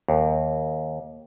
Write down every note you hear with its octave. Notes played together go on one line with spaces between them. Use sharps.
D#2